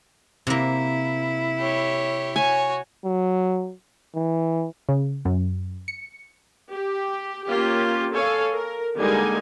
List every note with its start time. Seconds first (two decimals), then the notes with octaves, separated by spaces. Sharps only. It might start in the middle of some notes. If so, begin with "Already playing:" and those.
0.47 C3 A#3 E4
1.59 G4 C#5
2.36 F#4 C#5 G#5
3.05 F#3
4.16 E3
4.89 C#3
5.25 F#2
5.88 C#7
6.71 G4
7.46 A#3 C#4 F4 G4
8.13 A4 C#5 F5 G#5
8.53 A#4
8.97 D3 G3 G#3 A#3 D#4 G#5